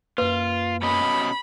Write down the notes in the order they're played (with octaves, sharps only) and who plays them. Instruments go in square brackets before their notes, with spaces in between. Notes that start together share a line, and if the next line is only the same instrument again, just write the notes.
[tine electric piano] F#2 A#3 [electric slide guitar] F4 [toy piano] B4
[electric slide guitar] B2 C#4 D#5 [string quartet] B5